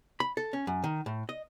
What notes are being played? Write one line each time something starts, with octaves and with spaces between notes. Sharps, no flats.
B5
A4
C#4
F#2
D#3
A2
D#5